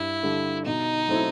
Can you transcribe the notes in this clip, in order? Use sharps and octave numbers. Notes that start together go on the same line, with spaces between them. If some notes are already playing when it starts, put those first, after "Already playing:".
Already playing: G2 E4
D3 G3
B2 D#4
F#3 A3 C4 E4